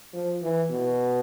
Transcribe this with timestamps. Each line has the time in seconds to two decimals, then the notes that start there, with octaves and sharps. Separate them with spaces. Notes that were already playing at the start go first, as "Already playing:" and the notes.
0.13 F3
0.42 E3
0.71 B2